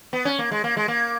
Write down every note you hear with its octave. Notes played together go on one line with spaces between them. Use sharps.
B3
C#4
A#3
G#3
A#3
G#3
A#3